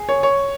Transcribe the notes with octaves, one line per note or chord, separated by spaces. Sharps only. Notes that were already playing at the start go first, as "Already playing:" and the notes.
Already playing: G#4
C#5
C#5